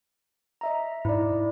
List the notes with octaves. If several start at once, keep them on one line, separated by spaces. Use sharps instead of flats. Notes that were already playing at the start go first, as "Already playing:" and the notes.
D#5 E5 A#5
G#2 E4 D5